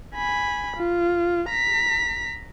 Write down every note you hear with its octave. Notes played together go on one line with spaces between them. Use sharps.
G#5 B5
F4
A#5 B6